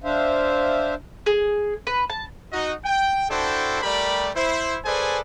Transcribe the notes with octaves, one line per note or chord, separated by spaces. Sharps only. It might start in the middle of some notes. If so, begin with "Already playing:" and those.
D4 C5 E5 F5
G#4
B4
A5
D#4 F#4 D#5
G5
D4 E4 F#4 A4 C5 G5
G3 A3 G4 A#4 D5 B5
E4 C5
G#4 A4 B4 C5 D5 G#5